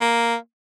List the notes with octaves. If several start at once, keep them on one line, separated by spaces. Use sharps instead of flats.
A#3